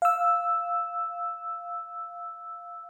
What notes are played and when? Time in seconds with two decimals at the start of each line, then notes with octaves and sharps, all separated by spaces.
0.02 F5 E6